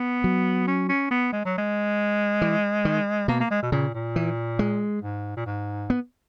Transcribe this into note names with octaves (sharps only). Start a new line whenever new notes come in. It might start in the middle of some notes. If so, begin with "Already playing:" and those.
Already playing: B3
F#3
C#4
C#4
B3
G#3
F#3
G#3
E3
D#3
B2 A#3
A#3
G#3
B2
A#2 C#3
A#2
E3
G#3
G#2
A#2
G#2
B3